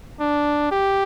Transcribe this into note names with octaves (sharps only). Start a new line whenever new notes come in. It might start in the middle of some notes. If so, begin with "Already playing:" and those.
D4
G4